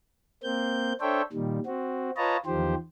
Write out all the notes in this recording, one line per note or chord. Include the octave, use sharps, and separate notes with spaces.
A#3 C4 G6
D4 A4 C5 C#5 E5 G5
A#2 D#3 G3
C4 F#4
F4 B4 C#5 D#5 A5 A#5
E2 D#3 F3 G4 C5